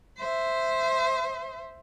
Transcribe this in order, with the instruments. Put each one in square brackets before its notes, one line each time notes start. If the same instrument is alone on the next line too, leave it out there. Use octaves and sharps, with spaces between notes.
[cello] C5 E5